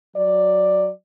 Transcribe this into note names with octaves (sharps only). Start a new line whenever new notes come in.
F#3 D5